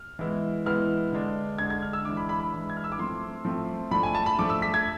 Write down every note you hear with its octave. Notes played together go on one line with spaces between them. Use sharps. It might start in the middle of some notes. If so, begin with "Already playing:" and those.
Already playing: F6
E3 G#3 B3 E4
E3 G#3 B3 E4 F6
D3 G#3 D4
D3 G#3 D4 G#6
G#6
F6
E6
E3 G#3 D4 D6
B5
B5
B5
E3 G#3 D4
G#6
F6
E6
D6
F3 A3 C4 C6
F3 A3 C4
F3 A3 D4 B5
G#5
A5
B5
F3 A3 D4 D6
E6
B6
G#6